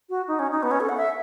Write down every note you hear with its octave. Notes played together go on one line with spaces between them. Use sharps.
F#4
D#4
C#4
D#4
B3
C#4
A4
F#5
E5